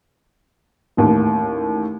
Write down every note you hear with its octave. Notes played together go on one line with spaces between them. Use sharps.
A1 D#2 A2